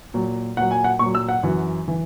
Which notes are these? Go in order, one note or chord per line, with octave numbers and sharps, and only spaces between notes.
A#2 F#3
A#2 F#3 F#5
G#5
F#5
A#2 F#3 C#6
E6
F#5
F#2 E3
E3